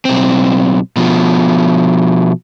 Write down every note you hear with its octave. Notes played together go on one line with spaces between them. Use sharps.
B1 C4
B2 F3